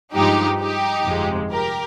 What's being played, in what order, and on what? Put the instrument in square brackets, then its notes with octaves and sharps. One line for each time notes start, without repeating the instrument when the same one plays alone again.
[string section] G2 F3 G#3 D#4 G4
D#4 G4
G1 F2 C3 F3 G#3
G4 A#4